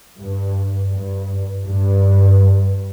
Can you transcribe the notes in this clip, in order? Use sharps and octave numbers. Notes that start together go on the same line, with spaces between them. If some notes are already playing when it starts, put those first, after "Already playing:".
G2
G2
G2